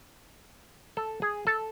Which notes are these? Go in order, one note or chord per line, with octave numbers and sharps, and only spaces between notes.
A4
G#4
A4